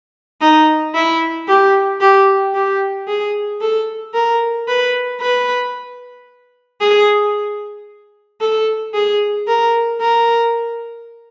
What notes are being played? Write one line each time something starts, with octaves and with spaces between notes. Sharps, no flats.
D#4
E4
G4
G4
G4
G#4
A4
A#4
B4
B4
G#4
A4
G#4
A#4
A#4